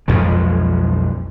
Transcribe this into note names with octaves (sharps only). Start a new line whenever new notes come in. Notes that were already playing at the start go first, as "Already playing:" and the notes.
B1 F2 F3 G#3